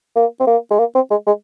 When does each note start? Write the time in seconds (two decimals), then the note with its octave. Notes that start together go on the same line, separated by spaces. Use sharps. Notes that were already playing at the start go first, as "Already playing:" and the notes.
0.16 A#3
0.40 C4
0.47 A#3
0.70 G#3
0.79 A#3
0.95 C4
1.11 G#3
1.27 G#3